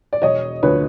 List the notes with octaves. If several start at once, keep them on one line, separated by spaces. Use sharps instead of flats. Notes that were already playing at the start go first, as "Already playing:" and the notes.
D5
E1 C#5 D#5
D2 D3 F3 A3 B4 C#5